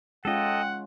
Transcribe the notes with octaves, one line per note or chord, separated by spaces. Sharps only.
G#3 C#4 F4 A4 D#5 F#5 G5